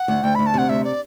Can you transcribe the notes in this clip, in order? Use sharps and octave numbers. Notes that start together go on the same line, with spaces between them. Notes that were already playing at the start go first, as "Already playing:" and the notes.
Already playing: F#5
D2
D2 G5
D2 B5
A5
C3 F#5
D2 E5
D5